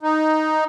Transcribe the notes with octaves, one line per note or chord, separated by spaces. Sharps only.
D#4